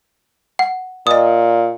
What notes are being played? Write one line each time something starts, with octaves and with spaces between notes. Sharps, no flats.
F#5
A#2 D#5 D#6